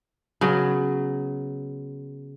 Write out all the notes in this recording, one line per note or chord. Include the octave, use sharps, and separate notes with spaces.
C#3 F#3 B3